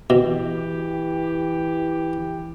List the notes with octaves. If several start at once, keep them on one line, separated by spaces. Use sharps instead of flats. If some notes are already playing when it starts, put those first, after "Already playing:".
B2 E3 G4